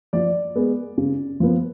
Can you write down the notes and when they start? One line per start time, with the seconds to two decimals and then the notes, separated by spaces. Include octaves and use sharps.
0.13 F3 D5
0.56 G#3 B3
0.98 C#3
1.40 F3 B3